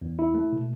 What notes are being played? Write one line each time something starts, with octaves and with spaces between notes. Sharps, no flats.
E2
E4
A3
B2